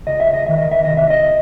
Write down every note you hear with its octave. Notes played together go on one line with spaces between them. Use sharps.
C#2 D#5
E5
D#5
D#3 E5
D#5
E5
D#5
C2
E5
D#5